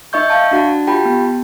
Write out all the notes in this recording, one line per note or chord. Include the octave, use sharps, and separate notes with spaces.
D#4 D#5 E5 C#6 G6
F5 A5 C#6
D4 F#4 F#5 A5
F4 G4 G5 A5 B5
B3